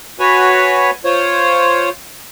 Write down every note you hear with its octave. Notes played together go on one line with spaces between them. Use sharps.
F#4 B4 C#5 G#5
F4 C5 C#5